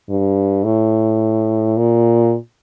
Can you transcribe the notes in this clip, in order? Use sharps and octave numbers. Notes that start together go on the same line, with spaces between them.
G2
A2
A#2